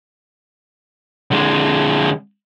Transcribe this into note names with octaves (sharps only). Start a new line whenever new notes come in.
D3 G#3